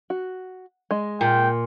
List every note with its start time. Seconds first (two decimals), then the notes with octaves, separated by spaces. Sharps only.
0.10 F#4
0.91 G#3 D#5
1.21 A#2 G5